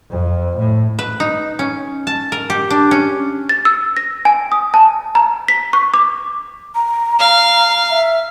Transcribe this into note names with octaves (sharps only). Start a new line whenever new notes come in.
F2
A2
B4
D#4
C#4
A5
A#4
G4
D4
C#4
A6
E6
A#6
G#5
D#6
A5
A#5
B6
C#6
D6
A#5
F5 A#5
E5